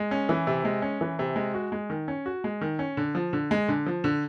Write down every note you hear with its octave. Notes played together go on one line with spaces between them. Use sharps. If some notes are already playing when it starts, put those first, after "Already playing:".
Already playing: G#3
C#4
E3
C3
G#3
C#4
E3
C3
G#3
F#4
G#3
D#3
C#4
F#4
G#3
D#3
C#4
D3
F3
D3
G#3
D3
F3
D3